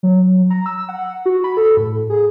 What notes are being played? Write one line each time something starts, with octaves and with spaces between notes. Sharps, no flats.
F#3
A#5
E6
F#5
F#4
B5
A4
A2
G#4